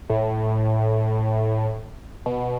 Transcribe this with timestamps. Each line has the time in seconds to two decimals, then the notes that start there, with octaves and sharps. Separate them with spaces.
0.10 A2
2.26 B2